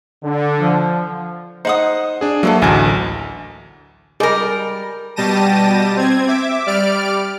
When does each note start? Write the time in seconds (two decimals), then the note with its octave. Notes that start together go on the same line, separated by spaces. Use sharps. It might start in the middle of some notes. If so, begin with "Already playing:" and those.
0.24 D3
0.59 F3
1.65 D#4 C5 F#5 D#6
2.21 D4 G#4
2.43 F#3 A#3 A4 C5 E5
2.62 A1 D2 A#4 G#5
4.20 G3 G#4 A#4 D#5
5.16 B2 G3 G4 A5 A#6 D#7
5.96 C4 G#6
6.28 E5 D6
6.66 G3 D5 F6 D7